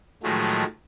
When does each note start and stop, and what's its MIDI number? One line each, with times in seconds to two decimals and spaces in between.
0.23 0.64 45
0.23 0.64 51
0.23 0.64 53
0.23 0.64 54
0.23 0.64 56
0.23 0.64 57